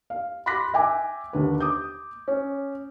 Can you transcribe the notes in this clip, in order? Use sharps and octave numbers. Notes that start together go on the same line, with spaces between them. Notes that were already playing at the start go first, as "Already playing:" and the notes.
F5
B5 C6 D6 F#6 A#6 B6
E5 G5 G#5 D6
D#2 D3 B4
D6 D#6 G6
C#4